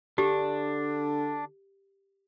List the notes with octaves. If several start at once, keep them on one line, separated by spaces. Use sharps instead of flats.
D3 D4 G4